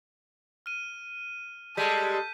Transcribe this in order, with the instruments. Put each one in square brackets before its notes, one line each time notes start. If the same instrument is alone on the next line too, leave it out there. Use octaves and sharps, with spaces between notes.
[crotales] F6 D#7
[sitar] G3 G#3 [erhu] A4 [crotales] G6 B6 D#7